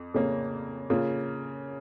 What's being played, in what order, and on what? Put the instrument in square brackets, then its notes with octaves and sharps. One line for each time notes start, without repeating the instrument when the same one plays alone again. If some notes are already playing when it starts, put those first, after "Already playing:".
Already playing: [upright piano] F2
F2 C#3 A#3 C#4
C#3 A#3 F4